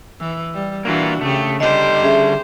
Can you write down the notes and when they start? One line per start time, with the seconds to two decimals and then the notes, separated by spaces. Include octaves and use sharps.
0.20 E3 E6
0.54 G3
0.85 E3 A#3 D4 F4 F#4
1.21 C#3 A3 G4
1.60 D3 G3 G4 C5 D#5
2.03 C#4 G#4 E5